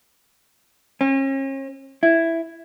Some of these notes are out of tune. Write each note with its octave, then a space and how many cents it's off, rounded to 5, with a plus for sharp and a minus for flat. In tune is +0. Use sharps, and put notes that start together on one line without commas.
C#4 -40
E4 +5